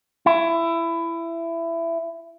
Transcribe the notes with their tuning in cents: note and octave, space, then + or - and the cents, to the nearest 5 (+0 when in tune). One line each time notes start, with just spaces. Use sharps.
E4 +20